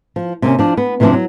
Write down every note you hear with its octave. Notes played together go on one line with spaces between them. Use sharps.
F3
C3 A#3 C4 C#4
F3 D4
B3
C3 E3 F3 G#3 C4 D4
F#3